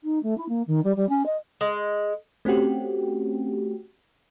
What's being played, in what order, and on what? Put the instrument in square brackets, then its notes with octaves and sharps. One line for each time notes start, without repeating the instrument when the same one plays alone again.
[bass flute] D#4
A3
E4
A#3
D#3
G3
G3
C#4
D#5
[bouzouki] G#3
[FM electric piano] A3 C4 C#4 F#4 G4